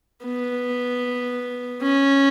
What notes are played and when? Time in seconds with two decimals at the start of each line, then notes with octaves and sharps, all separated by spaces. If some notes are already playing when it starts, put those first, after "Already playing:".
0.24 B3
1.82 C#4